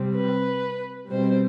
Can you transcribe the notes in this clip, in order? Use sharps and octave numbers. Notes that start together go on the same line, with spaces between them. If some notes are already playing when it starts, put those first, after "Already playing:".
Already playing: C3 G3 C4
B4
B2 G3 C4 C5